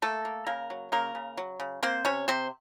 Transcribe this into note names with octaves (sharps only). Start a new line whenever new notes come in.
A3 A#3 A4
A#3
C#3 A#3 A#4
F#3
C#3 A#3 A#4
C#3
F#3
C#3
A#3 C4 C5
C3 C#4 C#5
C3 C4 C5